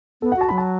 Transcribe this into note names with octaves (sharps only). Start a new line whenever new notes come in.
B3 A4
F#5
F#4 A5
F#3 B5
A5